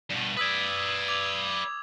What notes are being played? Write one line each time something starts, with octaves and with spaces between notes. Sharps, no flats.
G2 B2
B4 D5 D#6 E6 G#6
D6 G#6 F7